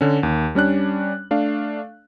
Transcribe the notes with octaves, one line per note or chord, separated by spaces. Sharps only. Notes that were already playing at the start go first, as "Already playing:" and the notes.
D3 C#4
D#2
G3 C#4 D4 F#6
A3 D4 F5